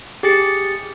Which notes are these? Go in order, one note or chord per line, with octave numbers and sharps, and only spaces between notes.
G4 G#4 A6 C#7